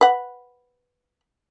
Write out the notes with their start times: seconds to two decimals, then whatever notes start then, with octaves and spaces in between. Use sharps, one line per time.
0.01 B4 F#5